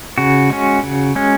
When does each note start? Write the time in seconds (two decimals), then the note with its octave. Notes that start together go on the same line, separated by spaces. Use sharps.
0.18 C#3 F#4
0.50 G#3 C#4
0.83 C#3
1.15 G#3 C#4